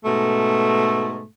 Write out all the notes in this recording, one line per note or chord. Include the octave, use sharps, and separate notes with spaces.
G#2 B2 A3